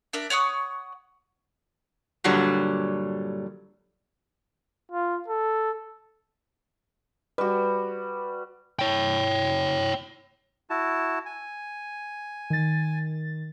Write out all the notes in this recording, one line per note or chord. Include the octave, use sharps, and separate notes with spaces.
D4 A#4 D5 E5
C#5 F#5 C#6 D#6
G2 A#2 D3 F#3 G3
F4
A4
G3 F#4 B4
C#5 G5
E4 F#4 A5
G#5
D#3 A6